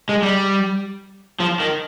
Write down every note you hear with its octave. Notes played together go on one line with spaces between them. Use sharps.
G#3
G3
F3
D#3